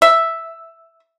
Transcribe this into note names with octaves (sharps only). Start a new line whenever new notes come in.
E5